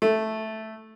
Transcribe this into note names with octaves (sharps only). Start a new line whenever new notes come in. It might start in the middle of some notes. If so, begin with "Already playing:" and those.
A3